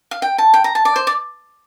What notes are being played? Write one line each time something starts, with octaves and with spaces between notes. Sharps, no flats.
F5
G5
A5
G5
A#5
A5
D5
C5
D5